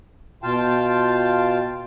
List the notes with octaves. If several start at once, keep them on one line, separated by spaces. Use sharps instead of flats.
B2 F4 F5 G5 A5